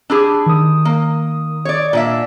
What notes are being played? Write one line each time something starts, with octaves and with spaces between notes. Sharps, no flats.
D4 G4 G#4 A5 B5 E6
D#3 D#6
A#3
C#5 D5
A#2 D4 E5